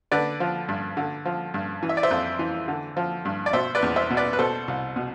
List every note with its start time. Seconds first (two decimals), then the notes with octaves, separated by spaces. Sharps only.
0.11 D3 B4 D5
0.40 F3
0.68 G2
0.97 D3
1.25 F3
1.54 G2
1.83 E3
1.89 E5
1.97 D5
2.03 C5 E5
2.11 F2
2.39 E3
2.68 D3
2.97 F3
3.25 G2
3.46 D5
3.53 B2 C5 E5
3.75 B4 D5
3.82 E2
3.96 C5 E5
4.10 B2
4.17 B4 D5
4.33 B4
4.39 B2 A4 C5
4.68 C2
4.96 B2